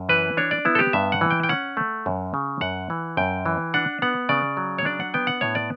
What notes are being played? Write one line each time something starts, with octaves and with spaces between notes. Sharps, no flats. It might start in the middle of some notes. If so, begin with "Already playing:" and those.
Already playing: F#2
E3 B4
D4 C#5
D5
B3 E4
A4
G4
G2 E5
F#5
E3
G5
G5
C#4 F#5
A3
F#2
C#3
F#2 F#5
E3
F#2 G5
E3
D4 F#5
B3 F#5
C#3 D5
F#3
C#5
D4 D5
F#5
B3 G5
F#5
A2 C#5
D5